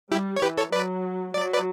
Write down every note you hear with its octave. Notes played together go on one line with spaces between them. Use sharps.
G3 E4 G4
C#5
E3 G4 B4
A4 C#5
F#3 B4 D5
F#3 D5
B4 D5